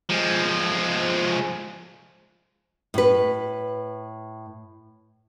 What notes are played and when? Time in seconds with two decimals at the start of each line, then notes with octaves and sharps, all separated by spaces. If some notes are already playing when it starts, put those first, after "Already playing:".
0.09 F3 G#3
2.94 A2 B4